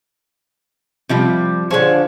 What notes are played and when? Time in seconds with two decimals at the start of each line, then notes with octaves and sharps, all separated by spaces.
1.09 C3 F3 G3
1.71 D3 F3 G#4 C#5